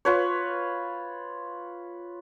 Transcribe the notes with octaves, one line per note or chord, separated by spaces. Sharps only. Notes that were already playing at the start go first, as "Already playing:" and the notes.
F4 B4 C#5